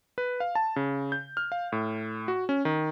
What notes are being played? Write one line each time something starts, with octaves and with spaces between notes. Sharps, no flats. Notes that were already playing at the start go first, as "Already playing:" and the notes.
B4
F5
A5
C#3
G6
F6
F5
A2
F#4
C#4
D#3